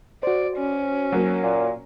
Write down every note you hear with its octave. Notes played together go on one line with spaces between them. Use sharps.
F#4 C5 D5
C#4
F#3 A#3
A#2